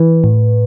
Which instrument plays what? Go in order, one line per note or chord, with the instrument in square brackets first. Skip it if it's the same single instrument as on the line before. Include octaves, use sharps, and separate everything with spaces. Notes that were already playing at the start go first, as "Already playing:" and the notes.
Already playing: [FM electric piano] E3 B4
A2